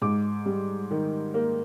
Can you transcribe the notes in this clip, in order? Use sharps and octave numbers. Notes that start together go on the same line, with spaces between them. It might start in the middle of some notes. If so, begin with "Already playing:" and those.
G#2 D6
G3
D#3
A#3